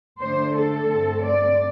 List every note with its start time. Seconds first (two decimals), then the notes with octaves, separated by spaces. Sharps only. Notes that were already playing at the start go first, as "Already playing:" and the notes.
0.21 D3 A3 D4 C5
0.55 A4
0.89 G2 D3 A3 C4
1.23 D5